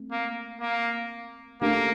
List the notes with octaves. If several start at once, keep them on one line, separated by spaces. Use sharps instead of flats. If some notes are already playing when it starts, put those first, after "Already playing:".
Already playing: A3 C4
A#3
A#3
A3 A#3 D4 G4 A#4